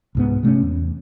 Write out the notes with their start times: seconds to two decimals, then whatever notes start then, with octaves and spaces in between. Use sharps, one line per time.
0.15 C2 G#2 B3
0.43 C3 A3 C4 C#4
0.62 E2